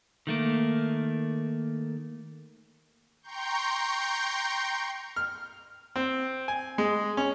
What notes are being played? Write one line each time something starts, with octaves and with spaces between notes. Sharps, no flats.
D#3 A3 A#3
G5 A#5 C6 C#6 G6
F6
C4
G#5
G#3
C#4